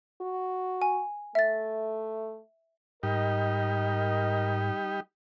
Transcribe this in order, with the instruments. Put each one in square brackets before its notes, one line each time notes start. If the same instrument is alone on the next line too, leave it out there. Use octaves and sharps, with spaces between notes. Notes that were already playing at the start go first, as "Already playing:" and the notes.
[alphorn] F#4
[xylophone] G#5
[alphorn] A3 [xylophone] E5 A6
[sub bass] G#2 [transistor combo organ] G3 D#4 G4 [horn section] A#4 D#5